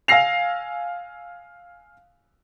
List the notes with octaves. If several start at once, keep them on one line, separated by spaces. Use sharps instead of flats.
F5 G#5 E6 A#6 C7 F7